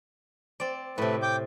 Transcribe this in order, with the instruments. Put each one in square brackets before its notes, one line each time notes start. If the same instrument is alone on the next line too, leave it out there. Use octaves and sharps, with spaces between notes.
[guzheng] C4 D5
[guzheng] A2 C3 [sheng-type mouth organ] A3 B4
[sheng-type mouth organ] G5 D6 G6